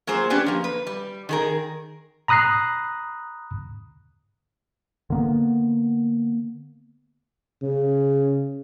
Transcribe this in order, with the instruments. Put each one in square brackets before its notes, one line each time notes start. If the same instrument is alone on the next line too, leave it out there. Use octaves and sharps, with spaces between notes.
[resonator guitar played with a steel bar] F#3 A#3 F4 G#4 C5
B3 C#4 D4 G4 B4
F3 A#3
B4
G3
D#3 G#4 A#4
[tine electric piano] A#5 B5 D#6 F#6 A#6 C7
[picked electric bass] D3 A#3 B3
[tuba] C#3